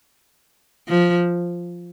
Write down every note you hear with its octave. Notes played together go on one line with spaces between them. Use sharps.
F3